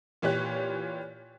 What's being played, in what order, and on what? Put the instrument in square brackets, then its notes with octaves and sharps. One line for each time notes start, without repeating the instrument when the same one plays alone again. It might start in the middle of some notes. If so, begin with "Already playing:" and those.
[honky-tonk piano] A#2 E3 G4 C#5 F#6